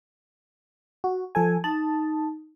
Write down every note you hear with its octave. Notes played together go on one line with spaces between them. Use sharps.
F#4
F3 A4 G#5
D#4 A5